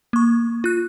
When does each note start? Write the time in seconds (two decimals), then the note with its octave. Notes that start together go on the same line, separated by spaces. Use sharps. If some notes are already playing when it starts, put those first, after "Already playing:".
0.13 A#3 C#6
0.64 F4 F#6